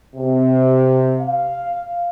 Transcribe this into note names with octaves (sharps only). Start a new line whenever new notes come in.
C3
F5